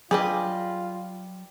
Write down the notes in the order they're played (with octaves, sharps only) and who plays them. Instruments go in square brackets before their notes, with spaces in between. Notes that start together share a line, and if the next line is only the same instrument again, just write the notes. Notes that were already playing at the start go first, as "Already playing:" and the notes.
[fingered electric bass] F#3 [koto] G3 B4 D#5 [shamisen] D4 G#4 [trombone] F4